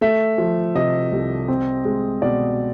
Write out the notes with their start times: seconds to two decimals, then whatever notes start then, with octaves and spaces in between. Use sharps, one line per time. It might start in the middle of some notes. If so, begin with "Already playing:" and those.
0.01 A3 E5
0.38 F3
0.75 C3 D#5
1.12 C2
1.48 C4
1.85 G#3
2.22 B2 D5